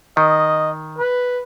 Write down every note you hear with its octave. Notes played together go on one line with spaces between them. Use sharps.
D#3 D#5
B4